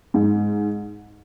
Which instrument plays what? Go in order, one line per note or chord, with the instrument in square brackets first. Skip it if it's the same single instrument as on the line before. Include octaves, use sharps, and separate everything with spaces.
[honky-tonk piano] G#2